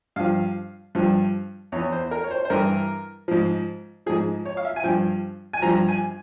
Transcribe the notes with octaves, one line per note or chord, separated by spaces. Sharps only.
G2 F3 F5
G2 F3
E2 E3 C#5
C5
A#4
C#5
C5
C5
G2 E3 A#4
G#2 F3
G#2 F3 G#4
C#5
F5
E5
G#5
G2 F3 G5
G#5
G2 F3 A#5
G#5